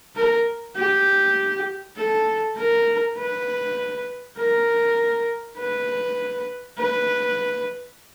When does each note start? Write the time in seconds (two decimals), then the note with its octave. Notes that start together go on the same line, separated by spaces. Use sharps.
0.16 A#4
0.76 G4
1.96 A4
2.57 A#4
3.17 B4
4.37 A#4
5.58 B4
6.78 B4